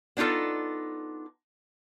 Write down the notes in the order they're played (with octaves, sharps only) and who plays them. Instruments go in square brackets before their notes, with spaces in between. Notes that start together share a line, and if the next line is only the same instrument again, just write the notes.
[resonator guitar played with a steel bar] B3 D4 D#4 F4 A4